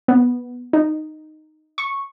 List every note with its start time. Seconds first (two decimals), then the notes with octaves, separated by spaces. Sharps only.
0.08 B3
0.73 D#4
1.78 C#6